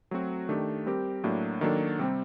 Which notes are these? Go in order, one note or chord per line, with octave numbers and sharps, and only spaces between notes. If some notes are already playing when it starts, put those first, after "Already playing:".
F#3 A3 C4 F#4
D#3 A3 D4 G4
G3 C4 G4 A#4
A2 F#3 A#3 D4
D#3 F#3 A#3 D4 A4
C3 G3 C4